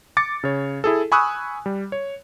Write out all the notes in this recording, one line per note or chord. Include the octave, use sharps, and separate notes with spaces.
D6 A6 C#7
C#3 C#5
E4 G#4 A4
G#5 B5 C#6 D#6 E6 F#6
G3
C#5